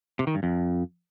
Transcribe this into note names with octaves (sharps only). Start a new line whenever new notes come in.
C3
D#3
G2
F2